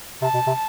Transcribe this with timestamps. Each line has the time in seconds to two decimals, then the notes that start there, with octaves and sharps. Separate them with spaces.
0.22 C3 A5
0.34 B2
0.47 C3